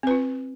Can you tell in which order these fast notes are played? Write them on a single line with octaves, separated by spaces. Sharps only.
C4 B4 F4